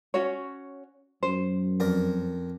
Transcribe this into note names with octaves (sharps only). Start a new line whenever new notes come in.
C#4 F#4 C#5
F#2 C5
F2 A#4 D5